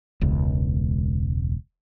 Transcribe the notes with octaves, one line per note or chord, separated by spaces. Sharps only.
E1 C#2